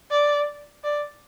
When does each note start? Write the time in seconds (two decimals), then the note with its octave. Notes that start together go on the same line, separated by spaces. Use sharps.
0.11 D5
0.84 D5